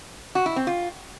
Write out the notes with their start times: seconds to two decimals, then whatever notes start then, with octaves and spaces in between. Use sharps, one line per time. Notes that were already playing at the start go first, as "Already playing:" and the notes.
0.35 F#4
0.46 E4
0.56 C4
0.67 F4